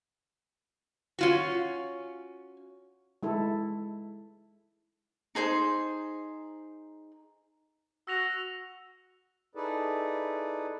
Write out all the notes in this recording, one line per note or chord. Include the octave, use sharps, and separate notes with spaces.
C#4 F4 F#4
G#3 E4 A4
D#4 G#4 C5 C6
F#4 E6 A#6 F7
D#4 E4 G#4 A4 B4 D5